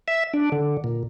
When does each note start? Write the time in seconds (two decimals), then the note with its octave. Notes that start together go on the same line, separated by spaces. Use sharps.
0.08 E5
0.34 D4
0.52 D3
0.84 A#2